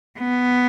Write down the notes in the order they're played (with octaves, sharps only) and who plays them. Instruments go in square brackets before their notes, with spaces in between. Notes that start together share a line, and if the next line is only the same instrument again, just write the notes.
[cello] B3